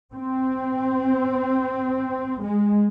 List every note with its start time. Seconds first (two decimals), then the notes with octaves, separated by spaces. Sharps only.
0.13 C4
2.42 G#3